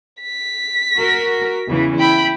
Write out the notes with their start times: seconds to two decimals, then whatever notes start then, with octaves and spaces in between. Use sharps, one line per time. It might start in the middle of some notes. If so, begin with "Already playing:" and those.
0.22 B6
0.97 F#4 A#4
1.68 E2 C#3 E3
1.99 E4 G5 B5